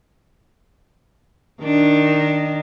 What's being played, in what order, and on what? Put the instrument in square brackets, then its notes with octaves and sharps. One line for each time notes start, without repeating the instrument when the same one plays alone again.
[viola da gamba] D#3 D4